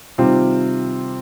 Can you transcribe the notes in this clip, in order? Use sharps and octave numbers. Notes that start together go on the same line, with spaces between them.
C3 D#3 G3 C4 F4